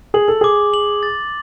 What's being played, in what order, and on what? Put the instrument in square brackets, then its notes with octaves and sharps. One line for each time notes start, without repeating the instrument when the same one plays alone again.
[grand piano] G#4 [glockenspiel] F#7
[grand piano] A4
[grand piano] G#4 [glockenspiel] D6
[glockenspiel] F#7
A6